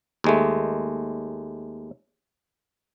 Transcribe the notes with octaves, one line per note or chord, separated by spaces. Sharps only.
D#2 G#3 A3